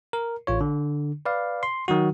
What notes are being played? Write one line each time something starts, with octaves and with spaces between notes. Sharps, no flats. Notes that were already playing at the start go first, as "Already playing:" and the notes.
A#4
A1 F4 C#5
D3
B4 D5 F5
C6
D#3 F#3 F#4